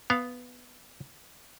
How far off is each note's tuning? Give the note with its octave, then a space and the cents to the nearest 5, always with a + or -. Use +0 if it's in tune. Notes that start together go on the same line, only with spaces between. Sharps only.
B3 +0 F5 +0